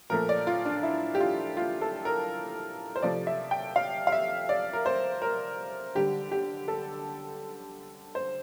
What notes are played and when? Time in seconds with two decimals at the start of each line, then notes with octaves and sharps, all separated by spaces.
0.10 A#2 F3 A3 A#4
0.29 D5
0.47 F4
0.65 D4
0.83 E4
1.15 G4
1.20 F4
1.57 F4
1.81 A4
2.05 A#4
2.96 C5
3.02 C3 F3 A3 D5
3.27 E5
3.51 G5
3.76 F5
4.07 F5
4.12 E5
4.49 D5
4.73 A#4
4.86 C5
5.22 A#4
5.95 D3 G3 G4
6.32 G4
6.68 A4
8.15 C5